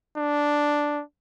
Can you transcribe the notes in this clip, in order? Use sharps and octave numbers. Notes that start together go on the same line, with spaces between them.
D4